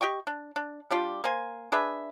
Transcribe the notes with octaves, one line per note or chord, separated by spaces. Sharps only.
G4 D#5 G5 C#6
D4
D4
G3 D4 F4 G4
A#3 C5 G#5
D4 G#4 B4 E5